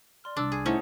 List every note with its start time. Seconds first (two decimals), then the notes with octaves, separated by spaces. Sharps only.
0.24 D5 C6 F6
0.37 C2 D4 D6 E6 A6
0.52 G#4
0.66 A2 C#4 D#4 C5 C#5 F#5 A5